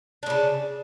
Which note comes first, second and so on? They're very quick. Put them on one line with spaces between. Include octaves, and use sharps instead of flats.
D4 A2 C#3